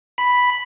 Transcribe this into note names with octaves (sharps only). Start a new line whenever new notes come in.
B5